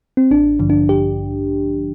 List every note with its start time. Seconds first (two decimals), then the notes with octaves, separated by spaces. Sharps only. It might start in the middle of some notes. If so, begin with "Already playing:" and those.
0.17 C4
0.31 A1 D4
0.59 G2 D3 F3
0.70 D4
0.89 G4